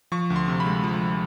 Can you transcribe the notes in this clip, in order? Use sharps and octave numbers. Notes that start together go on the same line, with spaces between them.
F3 C#6
D2
C6
C3
B5
G#3
F3